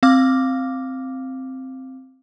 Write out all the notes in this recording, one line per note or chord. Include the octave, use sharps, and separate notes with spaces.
C4 F5 D6 F6